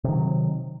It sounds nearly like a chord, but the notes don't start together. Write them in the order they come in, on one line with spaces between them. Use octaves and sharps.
C3 D#3 F#3